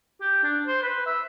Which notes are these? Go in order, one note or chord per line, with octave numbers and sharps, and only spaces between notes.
G4
D4
C5
B4
E5